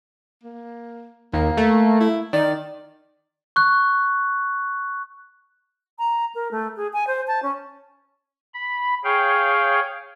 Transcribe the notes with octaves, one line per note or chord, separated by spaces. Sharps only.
A#3
D#2 A#3
A3
E4
D#3 D5
C#6 F#6
A#5
A#4
A3
G#4
G#5
C5
A5
C#4
B5
G#4 C#5 F5 G5